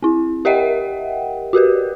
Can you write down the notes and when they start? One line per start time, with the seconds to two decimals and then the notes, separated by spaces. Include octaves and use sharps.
0.03 C4 E4
0.45 G4 A#4 D#5 E5 F#5 G5
1.53 F#4 G4 A#4 B4